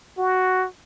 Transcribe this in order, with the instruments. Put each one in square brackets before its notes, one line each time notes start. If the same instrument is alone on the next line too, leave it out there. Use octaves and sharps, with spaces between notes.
[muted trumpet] F#4